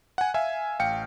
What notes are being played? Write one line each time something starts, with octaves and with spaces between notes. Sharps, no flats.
F#5 G#5
E5 F5 G#5
A1 F5 G5 C#7